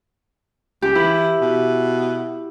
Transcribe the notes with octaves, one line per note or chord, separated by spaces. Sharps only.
C#2 G4
E3 E4
B2